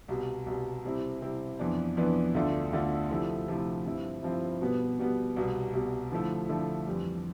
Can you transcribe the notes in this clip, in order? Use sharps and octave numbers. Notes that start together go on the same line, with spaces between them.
C2 B2 G3
C2 B2 G3
C3 G3 C4 E4
C3 G3 C4 E4
F2 E3 B3 D4
F2 E3 B3 D4
D2 D3 A3 D4 F4
D2 D3 A3 D4 F4
C3 F3 A3 E4
C3 F3 A3 E4
G2 F3 C4 E4
G2 F3 C4 E4
B2 G3 B3
B2 G3 B3
C2 B2 G3
C2 B2 G3
D3 F3 A3 E4
D3 F3 A3 E4
F2 E3 G3